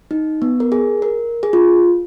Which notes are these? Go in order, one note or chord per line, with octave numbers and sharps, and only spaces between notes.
D#4
B3
A#4
G#4
A#4
G#4
F4